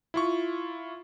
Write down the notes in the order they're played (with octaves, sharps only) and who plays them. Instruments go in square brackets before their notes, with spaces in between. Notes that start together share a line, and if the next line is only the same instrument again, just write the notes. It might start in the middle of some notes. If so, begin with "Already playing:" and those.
[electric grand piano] E4 F4 C#6